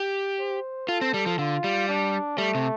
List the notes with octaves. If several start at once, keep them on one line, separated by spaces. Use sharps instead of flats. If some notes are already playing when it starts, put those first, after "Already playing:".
Already playing: G4
C5
F4 A4
C4
G3
F3
D3 F4
G3
D4
G3 A3
C3